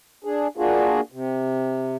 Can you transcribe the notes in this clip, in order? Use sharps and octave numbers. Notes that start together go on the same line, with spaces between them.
D4 G#4
A#3 D4 F4 F#4 G#4
C3